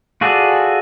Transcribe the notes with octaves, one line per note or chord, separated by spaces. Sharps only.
F4 F#4 G#4 A4 D5